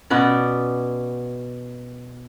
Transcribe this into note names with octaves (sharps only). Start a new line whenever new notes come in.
B2 B3 C#4 D5